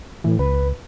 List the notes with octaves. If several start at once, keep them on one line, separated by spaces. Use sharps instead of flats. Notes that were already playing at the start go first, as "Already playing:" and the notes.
A2 E3
C#2 B4